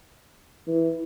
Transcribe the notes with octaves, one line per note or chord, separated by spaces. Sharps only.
E3